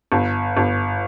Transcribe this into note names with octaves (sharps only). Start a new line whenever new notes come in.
G1
G1